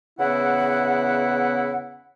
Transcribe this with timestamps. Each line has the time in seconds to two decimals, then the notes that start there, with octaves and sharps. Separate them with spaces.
0.19 E2 C#3 B3 E4 F#5